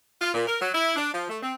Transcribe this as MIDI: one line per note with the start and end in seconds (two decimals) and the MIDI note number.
0.21 0.32 65
0.34 0.45 46
0.48 0.58 70
0.60 0.70 54
0.74 0.93 64
0.96 1.11 62
1.13 1.28 53
1.29 1.38 57
1.43 1.53 60